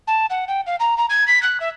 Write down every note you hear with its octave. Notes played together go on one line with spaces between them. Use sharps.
A5
F#5
G5
F5
A#5
A#5
G#6
B6
F#6
E5